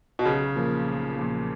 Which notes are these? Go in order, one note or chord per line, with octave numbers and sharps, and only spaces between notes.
B2
B1 C#3
A#2 F3 A#3
B1
A#2 F3 A#3